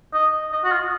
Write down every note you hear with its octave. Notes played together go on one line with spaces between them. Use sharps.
D#5
D#5
F#4
F4